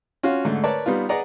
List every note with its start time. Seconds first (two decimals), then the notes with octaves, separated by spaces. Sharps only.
0.23 C#4 F4 F#4 F5
0.45 G#2 D3 A3
0.63 A#4 B4 C#5 D5 A5
0.86 G3 B3 D#4 F4
1.09 G#4 B4 D5 D#5 F#5 A#5